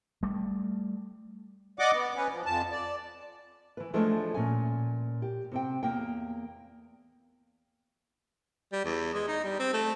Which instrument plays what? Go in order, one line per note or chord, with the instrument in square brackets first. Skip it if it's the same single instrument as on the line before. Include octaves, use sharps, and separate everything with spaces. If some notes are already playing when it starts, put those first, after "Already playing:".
[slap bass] G3 A3
[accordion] D5 D#5 F#5 D6
B3
C#4 B4
F3
F2 A5
D5
[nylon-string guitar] E3 B4
E3 F3 G#3 A3 D4
A#2 C#4 G#5
G4
C3 C4 G5
E2 A#3 G5
[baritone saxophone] G3
E2
G#3
D#4
G3
C4
A3